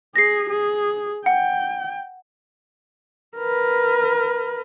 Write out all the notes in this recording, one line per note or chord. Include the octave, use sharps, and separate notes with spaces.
G#4 A#6 C7
G#4
F#5 G5
A#4 B4